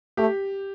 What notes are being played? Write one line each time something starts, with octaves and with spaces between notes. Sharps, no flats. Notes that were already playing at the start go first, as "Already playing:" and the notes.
A3 G4